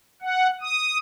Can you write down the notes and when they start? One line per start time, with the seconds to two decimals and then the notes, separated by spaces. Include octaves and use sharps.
0.22 F#5
0.61 D#6